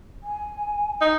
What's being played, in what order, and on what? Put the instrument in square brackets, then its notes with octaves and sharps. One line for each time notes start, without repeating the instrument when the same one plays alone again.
[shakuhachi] G#5
[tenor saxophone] D#4